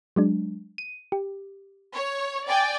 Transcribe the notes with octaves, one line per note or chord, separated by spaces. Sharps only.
F#3 G#3 D4
D#7
G4
C#5
D5 G5 G#5